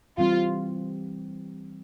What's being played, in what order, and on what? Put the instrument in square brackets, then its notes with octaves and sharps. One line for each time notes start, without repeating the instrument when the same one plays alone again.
[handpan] E3 G3 C4 [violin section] F4